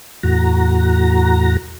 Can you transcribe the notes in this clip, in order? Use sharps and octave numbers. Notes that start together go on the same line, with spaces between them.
E2 A2 F#4 A#5